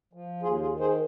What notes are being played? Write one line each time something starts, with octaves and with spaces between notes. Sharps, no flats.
F3
D#2 F4 G#4
F4 G#4
D#3
G#4 C5